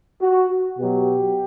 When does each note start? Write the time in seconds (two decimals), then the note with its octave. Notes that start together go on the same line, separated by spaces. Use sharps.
0.22 F#4
0.79 B2 F#3 G4